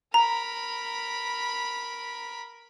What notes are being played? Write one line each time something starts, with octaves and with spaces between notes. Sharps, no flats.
A#4 A#5 B5